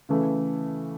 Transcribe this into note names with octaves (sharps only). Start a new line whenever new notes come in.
C#3 E3 A3